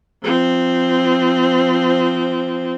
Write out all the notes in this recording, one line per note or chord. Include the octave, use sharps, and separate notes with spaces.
F3 C4